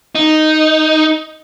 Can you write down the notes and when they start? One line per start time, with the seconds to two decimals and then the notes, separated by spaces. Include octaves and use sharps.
0.15 D#4